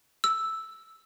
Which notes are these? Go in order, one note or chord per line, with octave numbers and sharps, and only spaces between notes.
E6